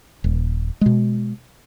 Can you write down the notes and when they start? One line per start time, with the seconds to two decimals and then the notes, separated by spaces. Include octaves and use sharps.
0.24 D#1
0.81 B2 G#3